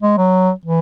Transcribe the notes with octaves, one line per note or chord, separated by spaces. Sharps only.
G#3
F#3
E3